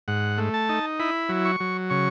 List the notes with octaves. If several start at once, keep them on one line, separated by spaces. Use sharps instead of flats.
G#2 F#5
A3
A5
D#4
E4 B5
F#3
C#6
F#3
C#3 C#6